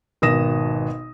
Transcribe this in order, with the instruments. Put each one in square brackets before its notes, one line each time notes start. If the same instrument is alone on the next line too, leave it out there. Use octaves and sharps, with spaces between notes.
[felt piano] G#1 B2 D#6 A#6 E7